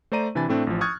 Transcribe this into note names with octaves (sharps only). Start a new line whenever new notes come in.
A3 C5 D5 A#5 D#7
C3 E3 D4 G#5 B5 A6
A2 A3 C4 D4
A1 F3
C#6 D#6 F6 F#6 G#6 A6